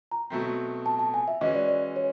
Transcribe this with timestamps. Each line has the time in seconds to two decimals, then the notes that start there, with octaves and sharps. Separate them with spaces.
0.12 A#5
0.30 B2 F#3 A3 C4
0.86 A5
0.99 A5
1.14 G#5
1.28 E5
1.41 E3 G#3 C#4 F#4 D#5
1.54 D5
1.68 D5
1.96 C#5